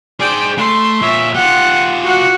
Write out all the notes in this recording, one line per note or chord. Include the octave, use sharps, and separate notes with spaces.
G#4 C5 D5 G5
A3 C6
A#2 C#5 E5
F4 G4 F#5
F#4 F#5